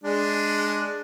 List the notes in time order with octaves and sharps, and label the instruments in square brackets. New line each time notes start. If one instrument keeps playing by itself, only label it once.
[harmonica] G#3 D4